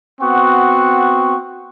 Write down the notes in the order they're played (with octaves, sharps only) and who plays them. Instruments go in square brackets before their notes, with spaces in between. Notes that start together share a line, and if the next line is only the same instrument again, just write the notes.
[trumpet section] B3 C4 F#4 F#5 C#6